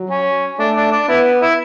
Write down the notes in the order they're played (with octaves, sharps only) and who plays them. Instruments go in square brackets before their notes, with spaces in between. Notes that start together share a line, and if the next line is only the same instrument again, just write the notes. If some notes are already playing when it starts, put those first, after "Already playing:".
Already playing: [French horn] F#3
[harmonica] C#4
[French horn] A3 [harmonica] D4
[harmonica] D4
D4
[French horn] B3 [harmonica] E4
[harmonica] E4